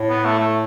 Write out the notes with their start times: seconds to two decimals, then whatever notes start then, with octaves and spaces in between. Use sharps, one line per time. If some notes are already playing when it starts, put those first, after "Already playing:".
Already playing: A2
0.10 B3
0.25 A3
0.39 A3